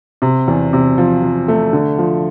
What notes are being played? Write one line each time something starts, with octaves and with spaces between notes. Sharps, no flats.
C3
E2
C3
F3
F3
A3
D3
F3